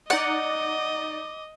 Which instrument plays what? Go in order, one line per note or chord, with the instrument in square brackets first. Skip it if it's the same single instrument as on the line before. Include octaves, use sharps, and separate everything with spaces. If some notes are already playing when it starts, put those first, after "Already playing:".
[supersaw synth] D#4 D5 [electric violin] D#5 [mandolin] F#5 [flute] D6